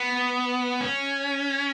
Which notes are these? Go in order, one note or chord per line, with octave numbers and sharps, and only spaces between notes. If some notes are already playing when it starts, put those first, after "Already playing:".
Already playing: B3
C#4